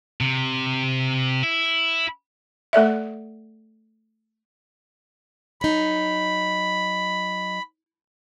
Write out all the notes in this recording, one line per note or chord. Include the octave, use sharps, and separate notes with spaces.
C3
E4
A3 A4 D5 E5
F#3 D#4 B5